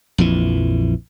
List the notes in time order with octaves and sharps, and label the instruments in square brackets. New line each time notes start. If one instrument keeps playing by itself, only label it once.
[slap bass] A#1 F2 E3